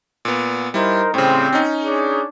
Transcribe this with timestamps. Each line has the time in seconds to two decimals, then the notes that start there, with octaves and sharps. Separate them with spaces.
0.25 A#2 B3
0.74 G3 D#4 E4 A#4 C5
1.14 A2 C#3 G3 C4
1.53 C#4 D#4
1.84 D4 G#4 C#5